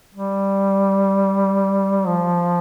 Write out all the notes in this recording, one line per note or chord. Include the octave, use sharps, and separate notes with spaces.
G3
F3